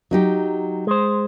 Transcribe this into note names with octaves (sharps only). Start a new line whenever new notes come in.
F#3 D#4 G4
G#3 C5